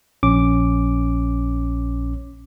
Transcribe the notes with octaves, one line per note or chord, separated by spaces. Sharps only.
A#1 C#4 D6